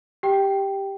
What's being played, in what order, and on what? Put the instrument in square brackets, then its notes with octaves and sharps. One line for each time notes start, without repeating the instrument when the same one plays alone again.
[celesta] G4 G5